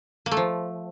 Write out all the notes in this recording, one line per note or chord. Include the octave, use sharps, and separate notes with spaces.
A#3
A3
F3